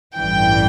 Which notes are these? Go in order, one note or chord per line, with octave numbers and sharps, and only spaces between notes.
A1 G2 E3 G5